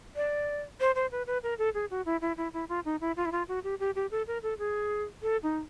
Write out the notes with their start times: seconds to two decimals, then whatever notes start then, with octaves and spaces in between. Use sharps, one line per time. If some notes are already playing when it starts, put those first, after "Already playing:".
0.16 D5
0.80 C5
0.95 C5
1.12 B4
1.27 B4
1.43 A#4
1.58 A4
1.74 G#4
1.91 F#4
2.06 E4
2.21 E4
2.37 E4
2.53 E4
2.69 F4
2.85 D#4
3.01 E4
3.17 F4
3.25 E4
3.32 F4
3.48 F#4
3.64 G4
3.80 G4
3.95 G4
4.11 A4
4.27 A#4
4.43 A4
4.59 G#4
5.22 A4
5.43 D#4